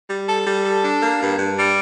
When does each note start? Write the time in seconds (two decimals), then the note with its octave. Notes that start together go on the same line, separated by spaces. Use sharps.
0.09 G3
0.27 A4
0.46 G3
0.64 A4
0.83 D4
1.01 A#3
1.20 G2
1.39 G2
1.57 G3